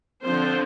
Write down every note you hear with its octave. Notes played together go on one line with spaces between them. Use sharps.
D3 F3 C4 C5